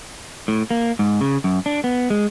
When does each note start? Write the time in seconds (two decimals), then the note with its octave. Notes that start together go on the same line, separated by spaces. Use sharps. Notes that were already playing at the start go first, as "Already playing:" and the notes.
0.48 A2
0.71 A#3
0.99 G#2
1.21 C#3
1.44 F#2
1.66 D4
1.84 B3
2.10 G#3